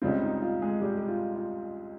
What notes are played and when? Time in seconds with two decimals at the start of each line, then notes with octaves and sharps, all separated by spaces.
0.02 C#2 C#3 G3 C4 F4
0.22 D#4
0.42 F4
0.62 G#3 G#4
0.81 G3 G4
0.98 G4
1.08 F4
1.35 F4